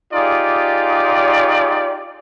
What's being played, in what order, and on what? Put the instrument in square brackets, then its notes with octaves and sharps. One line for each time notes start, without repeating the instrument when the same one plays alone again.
[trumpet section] D#4 F4 G4 G#4 D5